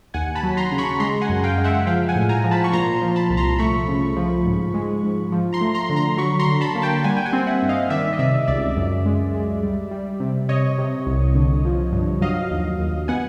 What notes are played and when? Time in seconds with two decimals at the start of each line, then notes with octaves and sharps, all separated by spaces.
0.14 D#2 F#5 G#5
0.35 A5 B5
0.43 F#3
0.57 A#5 C6
0.72 C#3
0.78 B5 C#6
1.00 G#3 A#5 C6
1.21 F#5 G#5
1.29 F#2
1.44 F5 G5
1.58 G#3
1.64 E5 F#5
1.87 F3 F5 G5
2.08 F#5 G#5
2.15 A2
2.29 G#5 A#5
2.44 F3
2.51 A5 B5
2.64 C#6
2.72 A#2 A#5 C6
2.94 A#5 C6
3.02 F3
3.16 A5 B5
3.30 C2
3.37 A#5 C6
3.58 A3 B5 C#6
3.88 C#3
4.16 F3
4.46 G#2
4.74 G#3
5.03 G#2
5.32 F3
5.53 A#5 C6
5.61 A3
5.75 A#5 C6
5.90 D3
5.96 A#5 C6
6.17 F#3 B5 C#6
6.39 A#5 C6
6.46 D3
6.61 A5 B5
6.75 A#3
6.82 G5 A5
7.04 G3 F#5 G#5
7.17 G5
7.25 F#5 G#5
7.33 C4
7.47 E5 F#5
7.62 G2
7.69 D#5 F5
7.90 D#3 D5 E5
8.13 D#5
8.19 C3 D5 E5
8.47 C#2 D5 E5
8.77 F#2
9.06 G#3
9.34 G#3
9.63 G3
9.91 G3
10.20 C3
10.49 C3 C#5 D#5
10.78 C3
11.07 C2
11.35 D3
11.65 F3
11.93 G2
12.21 F#3 D#5 F5
12.51 D#2
12.80 D#2
13.08 B3 F#5 G#5